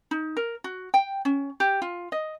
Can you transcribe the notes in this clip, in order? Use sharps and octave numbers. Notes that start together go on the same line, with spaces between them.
D#4
A#4
F#4
G5
C#4
G4
F4
D#5